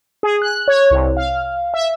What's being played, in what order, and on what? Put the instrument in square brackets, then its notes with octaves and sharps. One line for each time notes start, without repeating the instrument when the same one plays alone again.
[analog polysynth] G#4
F#6
C#5
C2
F5
E5